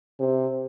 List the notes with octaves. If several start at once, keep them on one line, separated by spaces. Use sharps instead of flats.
C3